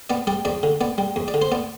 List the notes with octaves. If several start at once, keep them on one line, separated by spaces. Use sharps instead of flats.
B3 D5
G3 D5
E2 D5
D3
B3 D5
G3
E2
D5
D3
C5
B3 D5